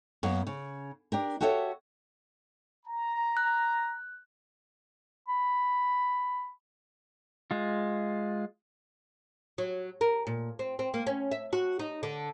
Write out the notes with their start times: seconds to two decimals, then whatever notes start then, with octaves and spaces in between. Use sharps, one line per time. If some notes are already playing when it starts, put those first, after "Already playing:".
0.23 F#2 A#3 B3
0.47 C#3
1.12 D4 G4 A#4
1.41 F#4 G4 A4 C#5 D#5 E5
2.86 A#5
3.37 F#6
5.28 B5
7.51 G#3 F4
9.58 F#3
10.01 A#4
10.27 A#2
10.59 C4
10.79 C4
10.94 A#3
11.07 C#4
11.31 E5
11.53 F#4
11.79 D#4
12.03 D3